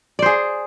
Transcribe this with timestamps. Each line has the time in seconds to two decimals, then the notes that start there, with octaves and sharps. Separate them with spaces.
0.19 D5
0.22 C5
0.26 G#4